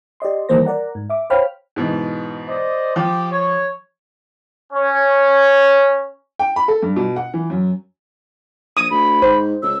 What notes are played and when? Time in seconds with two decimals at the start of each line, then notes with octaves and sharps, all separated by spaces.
0.20 G4 D5 D#5 C6
0.49 D#3 E3 G3 A#3 C5 A#6
0.65 A#4 D5 F#5 A#5
0.95 G#2
1.10 E5 D6
1.30 C5 C#5 F5 G5 B5 F6
1.76 G#2 B2 E3
2.49 C5 D5 D#5
2.96 F3 G4
3.31 C#5
4.73 C#4 C#5
6.39 G5
6.56 B5
6.68 A4
6.82 G2
6.96 B2
7.16 F#5
7.34 E3
7.50 F#2
8.77 A#1 D#6 D#7
8.91 D2 B5
9.22 G#2 C5
9.63 C#2 E6